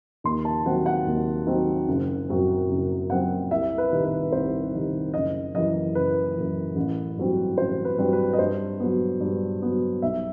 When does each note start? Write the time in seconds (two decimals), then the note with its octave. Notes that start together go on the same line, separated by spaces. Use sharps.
0.24 D#2 C6
0.45 A5
0.65 D#3 F#3 C4 F#5
0.86 F#5
1.07 D#2
1.46 D#3 F#3 C4
1.88 F#1
2.29 F#2 F#3 C4
2.69 F#1
3.10 F#2 F#3 C4 F#5
3.51 C2 E5
3.78 B4
3.92 C3 D#3
4.05 B4
4.32 C2 C5
4.73 C3 D#3
5.14 F#1 D#5
5.54 F#2 E3 D#5
5.95 F#1 B4
6.36 F#2 E3
6.76 A1
7.17 G2 F#3 C4
7.58 A1 C5
7.85 B4
7.98 G2 F#3 C4
8.13 B4
8.33 D#5
8.39 G2 C5
8.80 F#3 B3
9.20 G2
9.62 F#3 B3
10.02 B1 E5